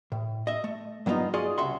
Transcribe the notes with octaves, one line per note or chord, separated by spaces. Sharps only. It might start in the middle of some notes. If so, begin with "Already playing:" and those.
A2
D#5 E5
A3
G2 F#3 B3 C4 D#4 F4
F4 F#4 G#4 D5 D#5
C2 C#3 E5 F#5 C6